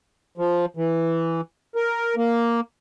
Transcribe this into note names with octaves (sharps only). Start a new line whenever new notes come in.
F3
E3
A#4
A#3